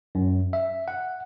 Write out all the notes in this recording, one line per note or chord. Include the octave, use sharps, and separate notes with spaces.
F#2
E5
F#5